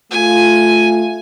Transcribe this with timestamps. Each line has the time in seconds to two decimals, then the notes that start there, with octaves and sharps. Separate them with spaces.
0.11 A3 F4 G#5